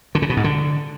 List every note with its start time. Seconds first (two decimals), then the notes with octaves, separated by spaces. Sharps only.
0.15 D3
0.22 C#3
0.30 B2
0.37 G#2
0.44 D3